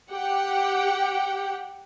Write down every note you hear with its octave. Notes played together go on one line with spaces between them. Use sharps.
G4 F#5 G5